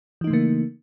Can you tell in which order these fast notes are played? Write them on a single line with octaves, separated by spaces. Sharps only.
E3 D#4 A3 C#3 A#3